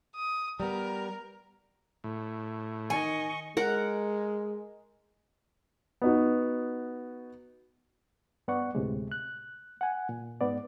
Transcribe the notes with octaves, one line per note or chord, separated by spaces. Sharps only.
D#6
G3 B3 A#4
A2
D#3 D#5 G#5 C#6
G#3 A#4 F#5
B3 D#4 F#4
G2 B3 D5 F#5 C#6
D2 A2 C3 G#3
F#6
F#5 G#5
A#2
G#2 B3 D5